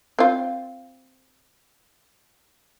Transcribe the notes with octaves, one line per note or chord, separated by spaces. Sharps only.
C4 F4